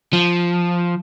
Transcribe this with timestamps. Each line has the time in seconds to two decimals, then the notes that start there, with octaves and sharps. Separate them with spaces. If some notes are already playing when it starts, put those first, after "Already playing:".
0.13 F3